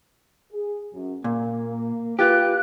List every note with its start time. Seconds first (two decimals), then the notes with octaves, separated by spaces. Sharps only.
0.52 G#4
0.94 F#2
1.24 A#2 A#3
2.19 F4 G4 B4 F#6